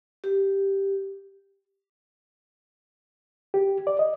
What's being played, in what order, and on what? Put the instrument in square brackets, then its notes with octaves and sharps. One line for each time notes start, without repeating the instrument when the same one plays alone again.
[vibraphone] G4
[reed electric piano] G4
D5
D#5